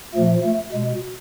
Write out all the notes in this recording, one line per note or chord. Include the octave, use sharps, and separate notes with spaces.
A#2 F3 A3
A3
B2 G#3